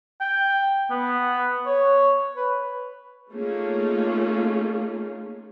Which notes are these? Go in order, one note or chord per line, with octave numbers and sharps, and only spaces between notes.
G5
B3
C#5
B4
A3 A#3 C#4 D#4 F4 G#4